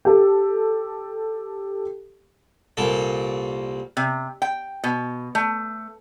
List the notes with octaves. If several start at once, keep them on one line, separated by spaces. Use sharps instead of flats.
G4 A4
C2 A#2 A4
C3
G5
B2
A3